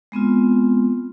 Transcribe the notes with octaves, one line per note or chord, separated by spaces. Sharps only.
G#3 B3 C4 F4